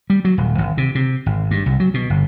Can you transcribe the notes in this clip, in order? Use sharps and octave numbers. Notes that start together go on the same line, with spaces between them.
G3
F#3
D#1
G#1
C3
C3
G#1
G2
C2
F#3
B2
G1